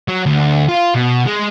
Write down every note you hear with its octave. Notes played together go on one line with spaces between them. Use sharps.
F#3
D2
F4
B2
G#3